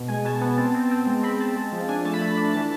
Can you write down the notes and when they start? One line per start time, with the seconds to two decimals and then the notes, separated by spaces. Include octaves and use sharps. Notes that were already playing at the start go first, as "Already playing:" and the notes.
Already playing: B2
0.08 G#3 G#5
0.24 B2 A5
0.41 B3 A5
0.58 C4 A5
0.74 C4
0.91 C4
1.07 G#3
1.23 C4 B5
1.40 C4 A5
1.56 G#3
1.72 F3
1.88 D4 G#5
2.05 A3 A5
2.13 B5
2.21 A3
2.37 D4
2.54 E3 A5